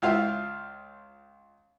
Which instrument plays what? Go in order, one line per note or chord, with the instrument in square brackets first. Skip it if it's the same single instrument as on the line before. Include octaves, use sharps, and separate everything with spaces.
[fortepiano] C#2 E4 F4 F5